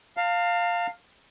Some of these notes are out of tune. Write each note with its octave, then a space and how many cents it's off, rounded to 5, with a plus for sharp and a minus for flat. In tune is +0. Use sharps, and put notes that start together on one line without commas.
F5 +5 A5 +45